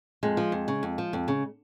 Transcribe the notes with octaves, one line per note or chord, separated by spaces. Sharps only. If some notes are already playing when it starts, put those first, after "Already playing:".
F2 G#3
F3
F2
C#3
F2
F3
F2
C#3